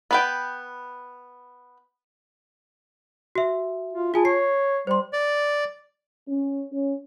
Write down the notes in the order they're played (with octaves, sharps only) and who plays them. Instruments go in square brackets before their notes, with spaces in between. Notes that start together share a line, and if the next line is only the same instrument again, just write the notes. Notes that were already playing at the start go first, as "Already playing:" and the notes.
[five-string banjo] B3 B4 G5
[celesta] F#4 E5
[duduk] F4
[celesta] F4 G#5 A5 [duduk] G#4
[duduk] C#5 [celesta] C7
[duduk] G3 [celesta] C5 C6
[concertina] D5
[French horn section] C#4
C#4